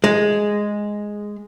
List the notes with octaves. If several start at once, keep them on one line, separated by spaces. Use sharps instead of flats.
G#3